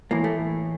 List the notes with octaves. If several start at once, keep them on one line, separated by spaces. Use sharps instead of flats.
A2 E3 A#3
A3